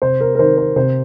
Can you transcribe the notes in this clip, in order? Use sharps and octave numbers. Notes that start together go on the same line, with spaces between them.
C3 C5
A#4
A#4
D#3 C5
C5
C3 C5